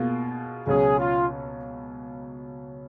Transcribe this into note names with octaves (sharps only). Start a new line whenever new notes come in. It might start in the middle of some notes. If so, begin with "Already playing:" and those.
Already playing: B2 A#3 F4 G#4
C#2 B2 F#3 C#4 G#4
F4